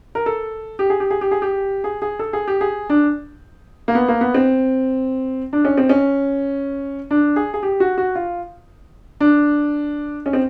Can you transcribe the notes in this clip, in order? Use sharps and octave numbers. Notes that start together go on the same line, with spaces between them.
A#4
A4
G4
G#4
G4
G#4
G4
G#4
G4
G#4
G#4
A4
G#4
G4
G#4
D4
A#3
B3
A#3
B3
C4
D4
C#4
C4
C#4
D4
G#4
G#4
G4
F#4
F#4
F4
D4
C#4
C4